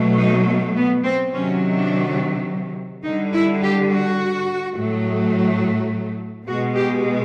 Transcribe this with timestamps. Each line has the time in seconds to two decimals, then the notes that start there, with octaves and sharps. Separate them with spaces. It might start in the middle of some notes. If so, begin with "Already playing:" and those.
Already playing: B2 F#3 A3
0.18 D#4
0.76 B3
1.04 C4
1.33 C3 D#3 F#3 C#4
1.75 D4
3.04 D3 G3 D#4
3.33 E4
3.62 G4
3.90 F#4
4.75 A2 F#3 A3
6.47 B2 G#3 F#4
6.75 G4